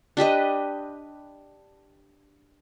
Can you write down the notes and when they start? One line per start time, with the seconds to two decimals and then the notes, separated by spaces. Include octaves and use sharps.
0.17 D4 G4 B4 D#5